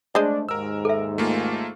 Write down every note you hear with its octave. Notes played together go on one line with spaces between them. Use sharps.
G#3 A3 D4 C5 D#5
D#2 G#2 A#4 E6
A4 E5
A3 A#3 F4